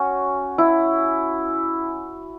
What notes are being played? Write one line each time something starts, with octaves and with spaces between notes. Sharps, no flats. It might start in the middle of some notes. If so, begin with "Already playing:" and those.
Already playing: C#4 F#4
E4